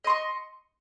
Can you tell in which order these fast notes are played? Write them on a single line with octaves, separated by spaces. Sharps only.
D#5 C6 C#6